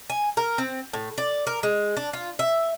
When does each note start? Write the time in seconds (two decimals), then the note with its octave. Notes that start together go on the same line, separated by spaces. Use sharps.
0.10 G#5
0.37 A#4
0.58 C4
0.93 A2
1.18 D5
1.47 A#4
1.63 G#3
1.97 D4
2.13 F4
2.39 E5